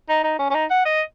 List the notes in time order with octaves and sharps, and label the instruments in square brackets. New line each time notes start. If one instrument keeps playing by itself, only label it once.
[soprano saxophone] D#4
D#4
C#4
C#4
D#4
F#5
D#5